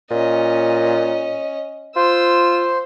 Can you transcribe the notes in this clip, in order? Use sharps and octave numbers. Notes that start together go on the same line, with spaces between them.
A#2 C#4 D#5
F4 C5 E6